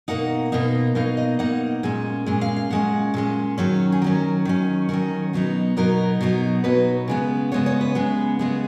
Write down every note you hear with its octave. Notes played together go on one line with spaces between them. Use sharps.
B2 A#3 D#4 F#5
B2 A#3 D#4
B2 A#3 D#4 F5
D#5
B2 A#3 D#4 F#5
A#2 G#3 C#4
A#2 G#3 C#4
F5
F5
A#2 G#3 C#4 F#5
A#2 G#3 C#4
D#3 F#3 C#4
G#4
D#3 F#3 C#4 A#4
D#3 F#3 C#4
D#3 F#3 C#4 A#4
B2 F#3 B3 D#4
B2 F#3 B3 D#4 A#4
B2 F#3 B3 D#4
B2 F#3 B3 D#4 B4
C#3 G#3 B3
C#3 G#3 B3 C#5
C#5
B4
C#3 G#3 B3
C#3 G#3 B3 G#4